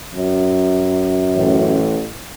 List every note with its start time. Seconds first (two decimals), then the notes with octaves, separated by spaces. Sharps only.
0.15 F#2
1.35 A1